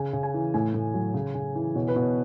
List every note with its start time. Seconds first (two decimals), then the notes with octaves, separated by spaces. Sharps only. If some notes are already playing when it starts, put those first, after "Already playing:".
Already playing: C#3 G#5
0.13 C#3
0.23 G#5
0.34 E3
0.54 A2 G#5
0.74 A2
0.94 F#3
1.14 C#3
1.35 C#3
1.55 E3
1.75 B2 C#5
1.88 B4
1.96 B2
2.02 C#5